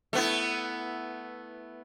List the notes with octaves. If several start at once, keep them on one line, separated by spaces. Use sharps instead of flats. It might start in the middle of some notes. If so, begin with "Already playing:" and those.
A3 B3 E4